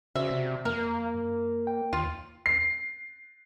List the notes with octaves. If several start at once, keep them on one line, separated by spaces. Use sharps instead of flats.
C#3 F#4 C5 D5 E5
C3
F2 A#3 A#4
F#2
G5
D#2 F4
C7